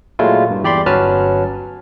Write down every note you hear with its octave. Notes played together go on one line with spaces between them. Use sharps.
A#2 F#3 G#3 A3 E4 F4
G2
E2 G4 D5 B5 C6
G1 F#3 C#4 B4 A5 F6